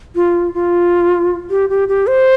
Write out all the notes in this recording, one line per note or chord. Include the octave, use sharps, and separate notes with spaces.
F4
F4
G4
G4
G4
C5